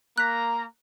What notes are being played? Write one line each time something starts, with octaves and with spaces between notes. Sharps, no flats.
A#3 A#5 F#6 B6